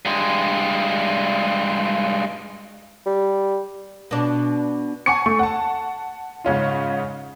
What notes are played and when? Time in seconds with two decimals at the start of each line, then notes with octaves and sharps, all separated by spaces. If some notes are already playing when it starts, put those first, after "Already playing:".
0.05 G2 G#3
3.06 G3
4.11 B2 D4
5.06 F#5 G#5 A5 C#6 D6 C#7
5.26 A3 C#6
5.39 F#5 A5
6.45 G#2 C#3 C#4 F4